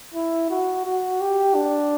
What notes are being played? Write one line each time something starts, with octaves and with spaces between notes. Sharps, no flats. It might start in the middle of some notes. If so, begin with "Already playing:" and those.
E4
F#4
F#4
G4
D4